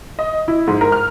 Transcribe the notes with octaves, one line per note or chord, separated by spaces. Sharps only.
D#5
E4
G#2
A#4
F6